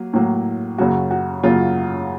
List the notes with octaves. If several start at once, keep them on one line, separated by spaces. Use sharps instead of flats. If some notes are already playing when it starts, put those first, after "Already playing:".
Already playing: F#3 A#3
A2 F#3 A#3
F#2 C#3 F#3 A#3 F#4
F#4
F#2 C#3 F#3 A#3 F4